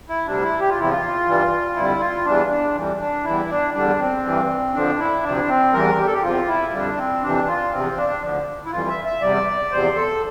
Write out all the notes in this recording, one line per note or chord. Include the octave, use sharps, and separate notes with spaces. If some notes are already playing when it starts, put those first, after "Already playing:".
E4
D2 C3 G3 D4
E4
G4
F4
E2 C3 F3 E4
F4
G2 E3 G3
F2 D3 G3 E4
F4
E2 E3 G3 D4
D4
F2 E3 G3
D4
E2 E3 G3 E4
D4
E2 D3 G3 D4
C4
G2 E3 G3
F2 D3 F3 D4
E4
D2 C3 F3 D4
C4
E2 E3 G3 A#4
G4
A4
G4
E2 C3 F3 F4
E4
F2 D3 G3 D4
C4
F2 C3 E3 D4
F4
E2 C3 F3 C4
D4
D2 D3 F3
E4
F2 E3 G3 F4
E5
E5
E2 C3 G3 D5
E2 C3 F3 C5
A4